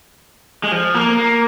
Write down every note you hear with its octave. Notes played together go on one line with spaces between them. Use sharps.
G#3
F3
A#3
A#3